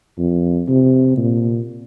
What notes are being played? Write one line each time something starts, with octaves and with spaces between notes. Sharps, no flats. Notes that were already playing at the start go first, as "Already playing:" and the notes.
F2
C3
A#2